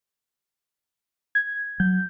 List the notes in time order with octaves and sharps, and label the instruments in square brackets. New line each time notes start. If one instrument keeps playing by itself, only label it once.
[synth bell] G#6
[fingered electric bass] F#3 [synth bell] G6